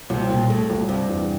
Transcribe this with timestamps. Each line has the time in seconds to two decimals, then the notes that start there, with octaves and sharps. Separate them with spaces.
0.10 C2 C3
0.30 C2 A#2
0.50 A2 A3
0.70 C2
0.89 G2 C3
1.09 E2